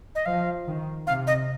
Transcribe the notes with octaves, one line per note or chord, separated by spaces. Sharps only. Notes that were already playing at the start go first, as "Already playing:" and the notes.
D#5
F3 F5
D#3
C3 F5
D#5